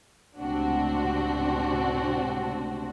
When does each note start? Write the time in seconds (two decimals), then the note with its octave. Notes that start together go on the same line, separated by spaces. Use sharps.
0.38 C#2 A2 C3 C4 D4 F#4